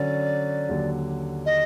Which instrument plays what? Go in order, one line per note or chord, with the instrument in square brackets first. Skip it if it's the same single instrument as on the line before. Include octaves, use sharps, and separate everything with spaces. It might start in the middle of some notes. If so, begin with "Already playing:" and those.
Already playing: [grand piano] D3 F#3 C#4 [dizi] D5
[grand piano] D#2 D3 F#3
[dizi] D#5